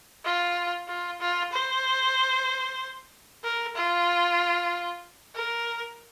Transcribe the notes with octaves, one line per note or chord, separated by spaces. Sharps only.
F4
F4
F4
C5
A#4
F4
A#4